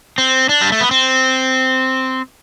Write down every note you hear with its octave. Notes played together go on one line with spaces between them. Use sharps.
C4
D4
G3
A3
B3
C4